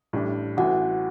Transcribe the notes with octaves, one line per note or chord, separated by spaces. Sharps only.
A1 A2 G3 D4
A1 A2 E3 F#4 F#5